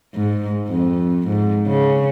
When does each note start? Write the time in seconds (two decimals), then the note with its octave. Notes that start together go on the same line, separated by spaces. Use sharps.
0.15 G#2
0.69 F2
1.27 G#2
1.68 C#3